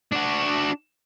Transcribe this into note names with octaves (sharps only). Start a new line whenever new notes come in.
D4 F#4